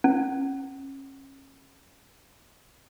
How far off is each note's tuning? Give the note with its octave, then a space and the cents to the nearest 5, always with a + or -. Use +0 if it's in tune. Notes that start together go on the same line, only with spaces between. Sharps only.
C#4 -30